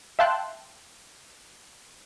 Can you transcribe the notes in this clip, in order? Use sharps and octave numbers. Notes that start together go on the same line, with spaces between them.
E5 F5 G5 A5 C6 F#6